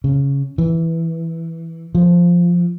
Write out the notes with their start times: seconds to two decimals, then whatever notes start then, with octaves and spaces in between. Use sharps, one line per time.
0.04 C#3
0.58 E3
1.95 F3